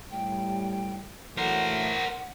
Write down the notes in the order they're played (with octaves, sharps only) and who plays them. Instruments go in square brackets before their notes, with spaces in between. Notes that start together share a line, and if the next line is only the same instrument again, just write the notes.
[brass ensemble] A2 G3 [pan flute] G5
[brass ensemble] E3 F#3 A3 [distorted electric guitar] A#4 C5 [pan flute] F#5